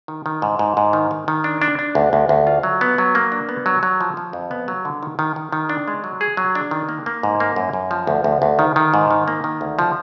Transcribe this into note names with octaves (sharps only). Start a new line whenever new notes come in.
D#3
D#3
G#2
G#2
G#2
D#3
D#3
D#3
D4
D4
D4
D2
D2
D2
F4
F#3
B3
F#3
A#3
D4
B3
F#3
F#3
F3
F3
F2
B3
F#3
D3
D#3
D#3
D#3
D#3
D4
G#3
F#3
G#4
F#3
D4
D#3
A#3
A#3
G#2
A#3
F#2
F#2
F3
D2
D2
D2
D#3
D#3
G#2
D#3
A#3
D#3
D2
F3